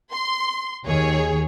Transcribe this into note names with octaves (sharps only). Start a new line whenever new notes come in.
C6
D#2 D#3 G#4 C#5